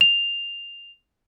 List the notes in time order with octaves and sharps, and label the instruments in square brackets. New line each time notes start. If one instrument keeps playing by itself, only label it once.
[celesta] F7